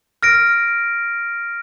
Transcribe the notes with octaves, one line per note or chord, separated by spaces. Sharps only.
F6 A#6 D7